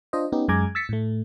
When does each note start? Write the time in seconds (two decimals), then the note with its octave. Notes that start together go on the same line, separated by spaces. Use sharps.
0.13 D4 F4 C5 D#5
0.32 B3 C#4 D#4 G4
0.48 F#2 G#3 G#5 A#5 D6 G#6
0.75 E6 A6 B6 C#7
0.89 A2 A3